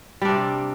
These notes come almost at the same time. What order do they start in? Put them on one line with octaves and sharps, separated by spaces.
G3 D4 C3